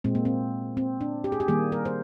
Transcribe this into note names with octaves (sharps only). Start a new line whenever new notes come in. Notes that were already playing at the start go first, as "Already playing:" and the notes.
A#2 G#3 C4
A#3
C4
C4
D4
G4
G#4
G4
D#3 G3 A#3 G#4
A#4
C5